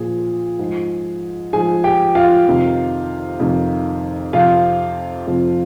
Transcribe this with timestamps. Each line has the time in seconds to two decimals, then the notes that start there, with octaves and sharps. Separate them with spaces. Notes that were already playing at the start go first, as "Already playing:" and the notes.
Already playing: A#2 F3 G#4
0.59 G#2 F3
1.53 G#2 F3 G#4 G#5
1.84 G4 G5
2.15 F4 F5
2.46 F2 C3 D#3
3.40 F2 C3 D#3
4.33 F2 C3 F3 F4 F5
5.27 F2 C3 F3